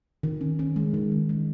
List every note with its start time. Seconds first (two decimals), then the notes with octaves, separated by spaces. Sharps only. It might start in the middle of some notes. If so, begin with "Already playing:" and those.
0.23 D#3
0.41 C#4
0.59 C#4
0.76 G#3
0.94 D#3
1.12 G#3
1.29 G#3